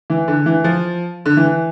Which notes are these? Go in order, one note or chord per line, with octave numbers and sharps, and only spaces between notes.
E3
D3
E3
F3
D3
E3